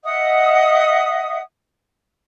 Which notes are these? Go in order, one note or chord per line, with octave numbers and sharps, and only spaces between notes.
D#5 E5 F#5 D#6